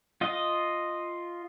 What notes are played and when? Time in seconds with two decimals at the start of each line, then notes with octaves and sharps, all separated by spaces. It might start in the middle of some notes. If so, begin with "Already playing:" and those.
0.21 F4 D#5